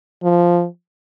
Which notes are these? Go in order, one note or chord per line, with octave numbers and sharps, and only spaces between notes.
F3